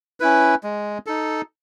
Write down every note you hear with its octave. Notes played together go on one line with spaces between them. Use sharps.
C#4 E4 B4
G#3
D#4 A4